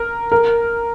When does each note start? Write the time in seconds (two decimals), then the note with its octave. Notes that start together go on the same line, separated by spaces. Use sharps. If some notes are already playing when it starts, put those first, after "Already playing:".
Already playing: A#4
0.32 A#4